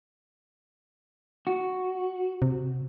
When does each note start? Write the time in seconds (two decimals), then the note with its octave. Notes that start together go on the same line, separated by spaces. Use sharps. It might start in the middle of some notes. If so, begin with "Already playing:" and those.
1.47 F#4
2.42 C3